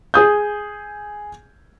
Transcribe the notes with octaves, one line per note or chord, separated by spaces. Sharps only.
G#4 D#6 G6